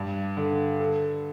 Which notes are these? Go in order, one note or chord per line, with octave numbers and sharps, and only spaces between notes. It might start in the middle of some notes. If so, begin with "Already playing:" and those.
Already playing: G2
D3
A4